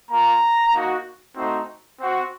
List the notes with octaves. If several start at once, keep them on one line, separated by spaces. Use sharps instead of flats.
A#3 F4 A#5
A#3 D#4 F#4
A3 C4 D#4 F#4
C4 F#4